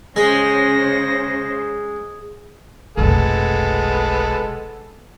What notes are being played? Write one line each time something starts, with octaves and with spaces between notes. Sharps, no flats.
C#3 G#3 C#4 G#4 C5 A#6
F1 B1 G#3 B3 A4